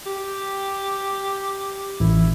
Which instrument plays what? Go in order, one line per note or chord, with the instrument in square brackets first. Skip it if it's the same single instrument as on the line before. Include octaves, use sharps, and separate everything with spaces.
[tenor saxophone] G4
[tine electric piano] A1 [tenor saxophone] E4